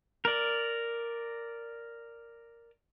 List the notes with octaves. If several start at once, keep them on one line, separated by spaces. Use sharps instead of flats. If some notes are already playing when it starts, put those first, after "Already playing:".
A#4 D5